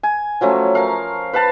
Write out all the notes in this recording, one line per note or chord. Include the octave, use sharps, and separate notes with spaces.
G#5
F3 F#3 A3 C#4
A#4 F5
B4 F5 A5 B5